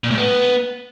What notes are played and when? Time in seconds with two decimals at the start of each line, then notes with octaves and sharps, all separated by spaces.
0.04 A#2
0.11 A2
0.18 B3